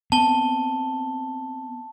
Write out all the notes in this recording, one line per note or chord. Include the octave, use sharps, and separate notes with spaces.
B3 C4 A5 G7